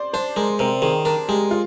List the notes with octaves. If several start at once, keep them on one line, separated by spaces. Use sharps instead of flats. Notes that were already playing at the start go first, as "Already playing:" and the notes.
Already playing: C5 D5
D4 C5
G#3 A#4
C3 A#4
D#3 G#4
D4 A#4
G#3 G4
F4